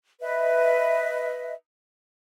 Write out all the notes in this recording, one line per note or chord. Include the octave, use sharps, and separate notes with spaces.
B4 D#5 E5